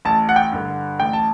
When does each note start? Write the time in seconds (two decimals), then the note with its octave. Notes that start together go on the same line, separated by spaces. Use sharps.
0.05 A1 A5
0.29 F#5
0.36 G5
0.52 G2 D3
0.99 A1 G5
1.13 A5